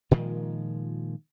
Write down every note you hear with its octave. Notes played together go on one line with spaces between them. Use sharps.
A#2 D#3 F3 G#3